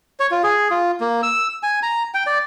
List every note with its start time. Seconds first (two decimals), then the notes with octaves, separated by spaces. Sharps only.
0.20 C#5
0.31 F4
0.44 G#4
0.71 F4
1.00 A#3
1.23 E6
1.63 G#5
1.83 A#5
2.14 G5
2.27 D5